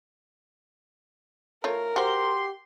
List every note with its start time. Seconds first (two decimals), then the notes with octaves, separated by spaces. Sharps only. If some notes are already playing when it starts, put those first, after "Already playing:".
1.64 A3 F4 A#4 C#5
1.96 F#4 G4 C5 C6